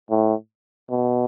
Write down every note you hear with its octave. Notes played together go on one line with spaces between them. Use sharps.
A2
B2